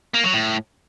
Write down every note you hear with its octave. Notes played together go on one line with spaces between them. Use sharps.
A#3
F#3
A2